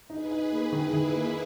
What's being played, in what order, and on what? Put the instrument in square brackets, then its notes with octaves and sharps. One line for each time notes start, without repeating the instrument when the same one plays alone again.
[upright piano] D#4 [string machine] G#4 B4
[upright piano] D#4
A#3
[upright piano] D#3 [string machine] E4 G#4
[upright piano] D#3
A#3